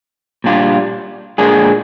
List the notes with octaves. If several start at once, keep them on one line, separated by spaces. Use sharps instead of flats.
A#2 G3 D4 F4
A#2 G#3 D4 G#4